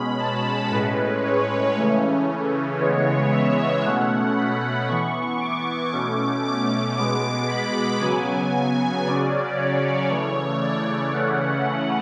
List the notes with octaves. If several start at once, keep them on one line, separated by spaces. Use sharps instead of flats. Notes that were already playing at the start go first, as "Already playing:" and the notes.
Already playing: B2 G#3 C#4 B5
A5
A2 G#3 C#4 B4
C#5
C#3 E3 A3 C#4
C#3 E3 G#3 B3 C#5
E5
B2 A3 C#4 F#5
B5
E3 B3 C#6
D6
B2 A3 C#4
D6
B2 G#3 B3 D6
B5
C#3 F#3 B3 G#5
C#3 F#3 C#4 D5
C#5
C#3 E3 A3
D5
C#3 E3 A3 C#4 F#5